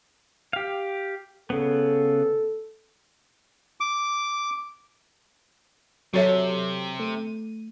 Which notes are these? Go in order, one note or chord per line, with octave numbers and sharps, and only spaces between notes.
G4 F5
C#3 B3 A4
D6
C3 F#3 F#4 A4 C#5 E5
A3 D#7